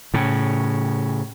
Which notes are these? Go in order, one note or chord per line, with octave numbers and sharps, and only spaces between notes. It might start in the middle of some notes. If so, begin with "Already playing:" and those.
A2 C#3